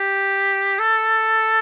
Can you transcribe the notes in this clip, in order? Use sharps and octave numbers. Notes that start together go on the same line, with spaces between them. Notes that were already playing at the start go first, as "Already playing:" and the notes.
Already playing: G4
A4